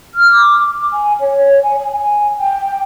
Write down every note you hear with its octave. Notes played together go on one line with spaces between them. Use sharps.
F6
D6
G#5
C#5
G#5
G#5
G5